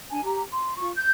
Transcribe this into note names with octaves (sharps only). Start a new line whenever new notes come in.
D4 G#5 A5
G4 A#5
C6
F4 C#6
G6